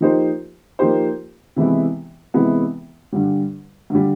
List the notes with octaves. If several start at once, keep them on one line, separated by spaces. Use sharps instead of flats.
F3 A#3 D#4 G4 C5
F3 A#3 D#4 G4 C5
C3 E3 G#3 B3 E4
C3 E3 G#3 B3 E4
G2 D3 G3
G2 D3 G3